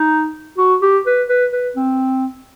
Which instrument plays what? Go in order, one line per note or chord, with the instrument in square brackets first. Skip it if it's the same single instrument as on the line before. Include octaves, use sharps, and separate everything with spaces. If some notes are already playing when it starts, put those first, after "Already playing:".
Already playing: [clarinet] D#4
F#4
G4
B4
B4
B4
C4